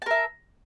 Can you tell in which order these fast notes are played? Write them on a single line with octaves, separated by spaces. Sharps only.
A5 A#4 E5